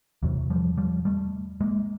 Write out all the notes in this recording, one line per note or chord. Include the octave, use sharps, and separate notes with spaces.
E2 C3 E3 F#3
F3 G3
F3 G3
G3 A3
G#3 A#3